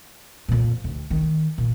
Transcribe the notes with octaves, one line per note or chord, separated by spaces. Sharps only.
F2 A#2
D2
D#3
A#2